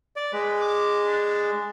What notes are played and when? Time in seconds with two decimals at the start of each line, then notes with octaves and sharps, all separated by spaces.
0.16 D5
0.33 G#3 B4
0.61 D6
1.06 D4